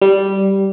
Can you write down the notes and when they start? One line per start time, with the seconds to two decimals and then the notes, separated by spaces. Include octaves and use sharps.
0.02 G3